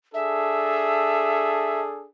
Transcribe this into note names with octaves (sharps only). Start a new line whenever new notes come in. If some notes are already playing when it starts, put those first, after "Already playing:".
D4 G#4 A4 E5